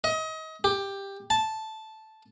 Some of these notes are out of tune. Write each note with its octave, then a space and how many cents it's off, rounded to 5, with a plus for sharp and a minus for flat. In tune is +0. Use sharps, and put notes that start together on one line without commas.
D#5 +30
G4 +10
A5 -5